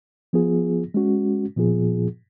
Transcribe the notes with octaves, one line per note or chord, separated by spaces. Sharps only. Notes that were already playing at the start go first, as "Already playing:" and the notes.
F3 B3 F4 G#4
G#3 C#4 F#4
A#2 F3 B3 F4 G#4